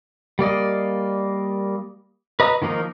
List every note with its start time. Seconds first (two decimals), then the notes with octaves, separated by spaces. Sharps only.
0.39 G3 A#3 D5 D#5
2.40 B4 D#5 A#5 D#6
2.62 D#3 F3 A#3 D#4 A#4